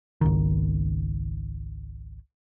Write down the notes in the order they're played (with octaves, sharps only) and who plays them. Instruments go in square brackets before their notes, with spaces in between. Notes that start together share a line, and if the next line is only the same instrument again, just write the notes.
[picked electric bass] G#1 C#2 D#3